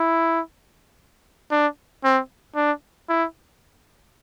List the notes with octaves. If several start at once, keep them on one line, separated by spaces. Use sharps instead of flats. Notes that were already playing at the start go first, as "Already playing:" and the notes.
Already playing: E4
D4
C4
D4
E4